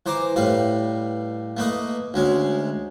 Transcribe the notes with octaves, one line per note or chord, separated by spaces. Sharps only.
E3 C5 A#5 D6
A2 G3 B4 F5
A3 A#3 B4 D#5
D2 G#3 C#4